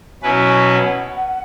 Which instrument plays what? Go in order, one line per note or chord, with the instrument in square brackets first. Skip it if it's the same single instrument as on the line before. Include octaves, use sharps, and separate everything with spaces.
[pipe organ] B2 F#3 C#4 E4 B4 [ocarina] G#5
[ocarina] G#5
F#5